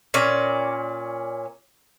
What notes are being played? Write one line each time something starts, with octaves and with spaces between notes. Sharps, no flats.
A#2 C#4 D5